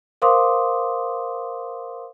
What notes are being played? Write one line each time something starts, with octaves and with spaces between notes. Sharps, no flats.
A#4 C5 F5 C6 D6 D#6